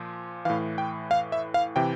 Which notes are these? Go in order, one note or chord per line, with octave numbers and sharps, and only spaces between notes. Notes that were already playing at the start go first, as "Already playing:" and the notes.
Already playing: A#2 F3
A2 E3 F5
G5
F5
E5
F5
C3 E3 G5